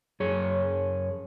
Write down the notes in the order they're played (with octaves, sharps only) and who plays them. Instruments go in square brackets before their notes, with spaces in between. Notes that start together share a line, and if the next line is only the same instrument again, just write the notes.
[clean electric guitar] F#2 G#4 C#5